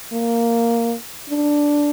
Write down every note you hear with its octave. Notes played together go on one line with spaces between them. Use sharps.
A#3
D4